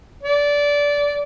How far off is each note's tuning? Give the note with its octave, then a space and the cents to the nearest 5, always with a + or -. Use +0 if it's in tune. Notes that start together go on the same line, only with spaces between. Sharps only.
D5 -20